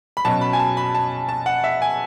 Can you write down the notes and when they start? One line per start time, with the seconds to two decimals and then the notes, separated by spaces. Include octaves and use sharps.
0.17 B5
0.25 B2 F#3 C#4 A5
0.41 B5
0.53 G#5
0.59 A5
0.77 B5
0.95 A5
1.29 A5
1.46 F#5
1.64 E5
1.82 G#5